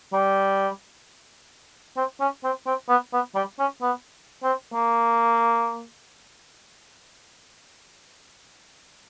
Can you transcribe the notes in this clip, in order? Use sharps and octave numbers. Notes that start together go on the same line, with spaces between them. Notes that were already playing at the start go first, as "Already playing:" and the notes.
G3
C4
C#4
C4
C4
B3
B3
G3
C#4
B3
C4
A#3